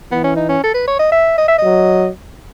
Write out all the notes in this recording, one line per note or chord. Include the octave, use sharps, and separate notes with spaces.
E3 B3
C#4
D#4
C#4
A4
B4
C#5
D#5
E5
D#5
E5
F#3 D#5